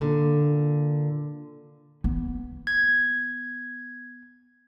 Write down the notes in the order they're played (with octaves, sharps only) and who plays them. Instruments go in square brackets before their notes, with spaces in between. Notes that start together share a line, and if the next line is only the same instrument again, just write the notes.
[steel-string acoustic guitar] A#2 D3
[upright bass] B3
[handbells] G#6